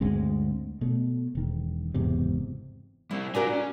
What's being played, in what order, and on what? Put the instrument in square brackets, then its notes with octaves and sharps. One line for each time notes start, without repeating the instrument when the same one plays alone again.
[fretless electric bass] D2 G2 G#3 C4
B2 A3
E1 D#3
F#1 E2 G#2 C3
[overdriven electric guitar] G3 C4 [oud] E4
[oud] D4 F#4 A#4 [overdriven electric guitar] F4 G#5
[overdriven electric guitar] C#4